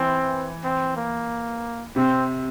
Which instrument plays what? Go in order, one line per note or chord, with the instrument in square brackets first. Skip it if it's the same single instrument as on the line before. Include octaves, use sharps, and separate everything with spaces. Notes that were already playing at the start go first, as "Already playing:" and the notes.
Already playing: [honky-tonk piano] E3 [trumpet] C4
[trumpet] C4
A#3
[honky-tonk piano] C3 [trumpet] C4